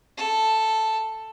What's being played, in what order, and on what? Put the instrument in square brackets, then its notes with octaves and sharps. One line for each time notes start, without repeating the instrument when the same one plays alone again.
[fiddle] A4